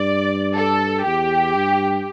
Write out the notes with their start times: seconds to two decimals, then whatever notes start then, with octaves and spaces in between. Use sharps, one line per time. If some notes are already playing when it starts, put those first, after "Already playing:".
Already playing: G2 D5
0.57 A4
1.06 E2 G4
1.55 G2